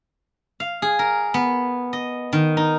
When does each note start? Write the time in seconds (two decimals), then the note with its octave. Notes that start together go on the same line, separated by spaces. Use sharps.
0.60 F5
0.82 G#4
0.99 A#4
1.34 B3
1.93 D#5
2.33 D#3
2.57 D#4